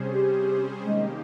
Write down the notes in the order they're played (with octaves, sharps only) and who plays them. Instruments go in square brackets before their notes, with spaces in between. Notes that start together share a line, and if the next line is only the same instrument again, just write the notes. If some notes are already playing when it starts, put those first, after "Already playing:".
Already playing: [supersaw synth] C3 G3 C#4 G#4 C5
[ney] G4
[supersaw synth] D#3 A#3 D#4 G4 [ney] G#3